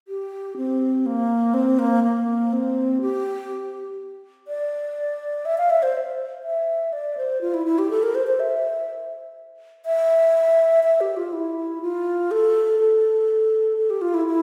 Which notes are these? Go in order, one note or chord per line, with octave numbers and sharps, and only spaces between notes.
G4
C4
A#3
C4
A#3
A#3
C4
G4
D5
E5
F5
E5
C5
E5
D5
C5
F4
E4
E4
G4
A4
A#4
C5
C5
E5
E5
E5
G4
F4
E4
F4
A4
A4
A4
G4
F4
E4
E4